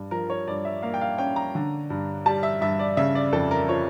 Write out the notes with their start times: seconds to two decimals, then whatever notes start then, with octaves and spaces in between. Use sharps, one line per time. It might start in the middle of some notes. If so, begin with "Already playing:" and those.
Already playing: G2
0.11 F3 A#4
0.30 C#5
0.48 G2 D5
0.65 E5
0.83 A#3 F5
0.94 G5
1.01 F5
1.18 C#4 G5
1.36 A#5
1.55 D3
1.90 G2
2.26 G3 A5
2.43 E5
2.61 G2 E5
2.79 D5
2.97 C#3 E5
3.15 D5
3.33 F2 A4
3.51 A#4
3.69 F3 C#5